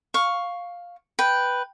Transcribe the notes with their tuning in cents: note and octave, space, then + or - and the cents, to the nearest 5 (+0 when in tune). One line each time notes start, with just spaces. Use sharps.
F5 +10 C#6 +0
B4 +0 G5 +0